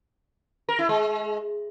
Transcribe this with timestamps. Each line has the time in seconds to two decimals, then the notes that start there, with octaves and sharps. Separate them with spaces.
0.69 A#4
0.79 E4
0.89 G#3